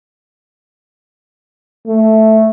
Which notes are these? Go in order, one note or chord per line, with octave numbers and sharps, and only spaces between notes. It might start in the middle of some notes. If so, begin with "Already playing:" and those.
A3